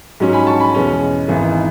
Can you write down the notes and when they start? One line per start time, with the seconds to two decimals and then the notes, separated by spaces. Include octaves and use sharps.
0.20 G#2 F#3 C#4
0.33 G#5 B5
0.47 A5 C#6
0.60 G#5 B5
0.74 E2 B2 G#3 C#4
1.28 G#1 G#2 E3 B3